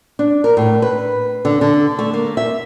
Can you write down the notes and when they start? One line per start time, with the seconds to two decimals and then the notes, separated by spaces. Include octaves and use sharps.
0.19 D4
0.44 A#4
0.57 A2
0.82 B4
1.45 D3
1.61 D3
1.99 A3
2.13 A#3
2.37 E5